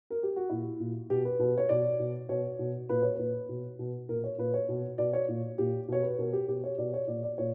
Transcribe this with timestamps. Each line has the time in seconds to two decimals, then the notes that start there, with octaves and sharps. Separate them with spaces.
0.10 A#4
0.23 G4
0.36 F#4
0.50 A#2 E4
0.80 A#2
1.10 B2 G4
1.25 B4
1.39 B2 B4
1.57 C#5
1.69 B2 D5
1.99 B2
2.29 B2 C#5
2.59 B2
2.89 A#2 B4
3.02 C#5
3.15 A#2 B4
3.49 B2
3.79 B2
4.09 A#2 A#4
4.24 C#5
4.38 A#2 B4
4.54 C#5
4.69 B2
4.98 B2 D5
5.13 C#5
5.28 A#2
5.58 A#2 G4
5.88 B2 C#5
6.03 B4
6.18 B2 A#4
6.33 G4
6.48 B2 G4
6.64 C#5
6.78 B2 D5
6.94 C#5
7.07 A#2 D5
7.23 D5
7.38 A#2 C#5